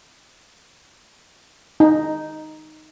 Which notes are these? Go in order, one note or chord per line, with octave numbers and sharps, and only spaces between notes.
D#4